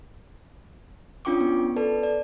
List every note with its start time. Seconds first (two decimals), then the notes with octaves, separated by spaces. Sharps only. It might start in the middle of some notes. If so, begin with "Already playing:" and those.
1.25 C#4 D4 F4 G5 C#6 D6
1.40 B3
1.76 A4 B4 D5 A5
2.03 D5